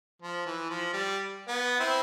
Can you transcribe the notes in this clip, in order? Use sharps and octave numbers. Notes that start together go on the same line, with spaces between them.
F3
E3
F3
G3
B3
C4 E4